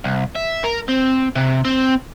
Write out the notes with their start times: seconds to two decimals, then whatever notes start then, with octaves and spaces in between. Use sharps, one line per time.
0.04 C2
0.35 E5
0.64 A#4
0.89 C4
1.35 C3
1.65 C4